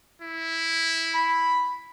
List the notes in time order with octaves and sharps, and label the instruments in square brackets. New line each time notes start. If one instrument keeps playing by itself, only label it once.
[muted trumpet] E4
[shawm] B5